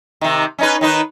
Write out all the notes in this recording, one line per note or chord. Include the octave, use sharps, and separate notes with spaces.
C3 D#3
C#4 D#4 B4
D#3 D#4 B4